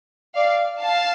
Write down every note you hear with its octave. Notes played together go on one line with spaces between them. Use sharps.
D5 F5
F5 A5